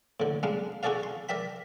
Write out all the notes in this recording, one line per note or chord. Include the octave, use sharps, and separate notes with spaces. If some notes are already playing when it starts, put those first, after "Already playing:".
A2 D3
G3 G#3 D4 F5
D#4 F#4 G#4 A4 D5 F5
C6
A#4 D5 E5 G5 B5